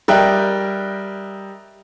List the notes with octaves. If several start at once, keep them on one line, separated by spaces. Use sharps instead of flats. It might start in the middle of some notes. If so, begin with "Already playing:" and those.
G3 A#4 D#5 E5 G5 F#6